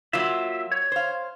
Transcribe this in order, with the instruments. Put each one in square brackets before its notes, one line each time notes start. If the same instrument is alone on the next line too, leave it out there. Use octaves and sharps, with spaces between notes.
[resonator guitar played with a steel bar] F#3 A#3 F4 [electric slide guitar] E5
[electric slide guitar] C#5
[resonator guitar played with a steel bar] C5 F5